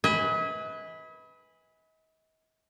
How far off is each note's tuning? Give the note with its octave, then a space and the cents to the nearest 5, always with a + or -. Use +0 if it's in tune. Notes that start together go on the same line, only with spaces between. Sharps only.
B4 +0 D#5 +45 G#5 -10